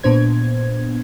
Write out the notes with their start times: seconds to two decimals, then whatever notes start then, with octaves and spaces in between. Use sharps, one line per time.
0.04 A#2 B3 D4 C5 G#6